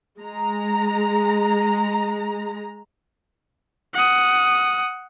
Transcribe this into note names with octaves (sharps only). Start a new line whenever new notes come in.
G#3 A#5
F#5 D#6